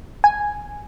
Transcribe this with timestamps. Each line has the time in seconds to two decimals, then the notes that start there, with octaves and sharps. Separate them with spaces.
0.24 G#5